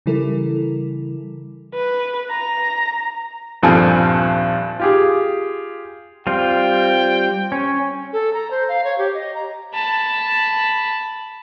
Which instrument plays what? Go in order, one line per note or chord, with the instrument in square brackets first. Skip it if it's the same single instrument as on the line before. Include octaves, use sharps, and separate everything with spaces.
[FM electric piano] C#3 E3 G3 E4 A4 A#4
[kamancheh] B4
A#5
[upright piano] D#1 G2 F3 C4 A4 G#5
F4 G4 G#4
[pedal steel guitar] G3 C4 F4 [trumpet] G5
[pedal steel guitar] C#4
[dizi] A4
A#5
C5
F5
C#5
G4
D#5
A#5
[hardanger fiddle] A5 B5